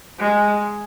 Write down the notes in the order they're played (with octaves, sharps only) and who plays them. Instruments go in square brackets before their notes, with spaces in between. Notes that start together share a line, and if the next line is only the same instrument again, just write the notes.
[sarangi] G#3